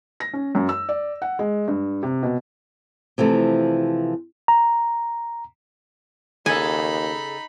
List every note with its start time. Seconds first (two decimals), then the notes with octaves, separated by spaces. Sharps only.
0.20 A#6
0.33 C#4
0.55 F#2
0.69 E6
0.89 D5
1.22 F#5
1.39 G#3
1.68 G2
2.03 C3
2.23 B2
3.18 C3 E3 F3 A3
4.48 A#5
6.46 D#2 C#3 D#4 G#4 A4 G#5 B5